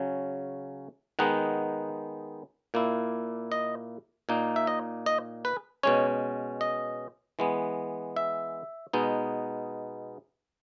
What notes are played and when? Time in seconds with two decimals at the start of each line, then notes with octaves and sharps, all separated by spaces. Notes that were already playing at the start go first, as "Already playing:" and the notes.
Already playing: C#3 F#3 C#4
1.19 D#3 G#3 B3 D#4 F#5
2.74 A#2 A#3 E4
3.52 D#5
4.29 A#2 A#3 D#4
4.56 E5
4.67 D#5
5.06 D#5
5.45 B4
5.83 B2 G#3 C#4 C#5
6.61 D#5
7.39 E3 G#3 B3
8.16 E5
8.93 B2 G#3 B3 D#4